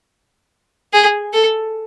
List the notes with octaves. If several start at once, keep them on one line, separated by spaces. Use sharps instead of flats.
G#4
A4